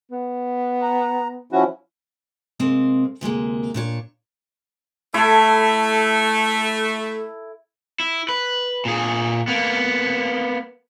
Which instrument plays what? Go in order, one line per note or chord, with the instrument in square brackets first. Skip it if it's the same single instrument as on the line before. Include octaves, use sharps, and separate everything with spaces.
[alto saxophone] B3
[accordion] A#5
[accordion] F3 C#4 E4 [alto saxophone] F#4
[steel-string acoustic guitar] C3 G#3 A#3 C4
D2 C3 G#3 A#3
A#2 D4 C#5
[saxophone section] A3 [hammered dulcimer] E4 A4
[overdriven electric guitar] E4
B4
A#2 G#4
A#3 B3